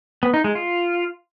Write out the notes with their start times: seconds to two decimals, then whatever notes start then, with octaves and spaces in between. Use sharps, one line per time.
0.23 B3
0.34 D#4
0.44 G#3
0.55 F4